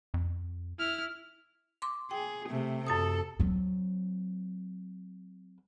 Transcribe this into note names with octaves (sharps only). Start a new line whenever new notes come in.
F2
E4 F6
C6 D6
G#4 G5
C3 A3
F#2 A4 A5 D#6
F#3 C4